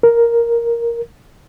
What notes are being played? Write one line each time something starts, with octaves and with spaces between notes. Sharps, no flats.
A#4